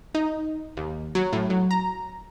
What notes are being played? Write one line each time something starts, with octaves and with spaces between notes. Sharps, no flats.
D#4
D#2
F#3
A2
F#3
A#5